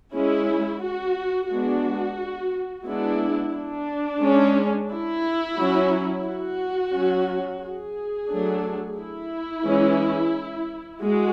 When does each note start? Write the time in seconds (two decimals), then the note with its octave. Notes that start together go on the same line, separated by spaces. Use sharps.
0.13 G#3 C#4 E4
0.82 F#4
1.50 G#3 B3 D4 F#4
2.85 G#3 B3 D4 E4
3.53 D4
4.21 G#3 C#4
4.90 E4
5.57 F#3 C#4
6.25 F#4
6.93 F#3 C#4
7.62 G#4
8.28 F#3 A3 D4
8.97 E4
9.64 E3 G#3 C#4
11.01 G#3 F#4